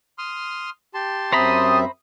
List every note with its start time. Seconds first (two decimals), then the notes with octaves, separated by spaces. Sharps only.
0.18 C6 D#6 F6
0.94 G4 A5 C6
1.32 F#2 C4 C5 E5 A#5 B5 D#6